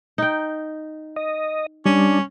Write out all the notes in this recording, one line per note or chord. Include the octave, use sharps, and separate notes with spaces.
D#4 G5
D#5
G3 C#4 D4